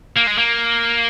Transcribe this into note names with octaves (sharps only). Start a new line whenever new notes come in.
A#3
G#3
A#3